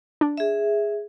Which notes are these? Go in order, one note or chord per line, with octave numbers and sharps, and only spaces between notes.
D4
G#4 E5